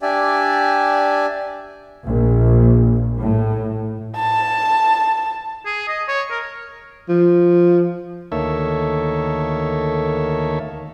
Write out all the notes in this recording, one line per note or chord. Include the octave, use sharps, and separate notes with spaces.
D4 G4 D5 E5 G#5
A#1
A2
A5
G#4
D#5
C#5
A#4
F3
D2 D#3 A#3 A4 C#5 E5